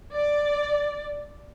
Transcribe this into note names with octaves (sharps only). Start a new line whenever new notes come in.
D5